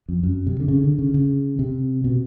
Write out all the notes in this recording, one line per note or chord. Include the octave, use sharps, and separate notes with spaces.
F2
F#2
C3
D3
C#3
D3
C#3
C#3
C3
B2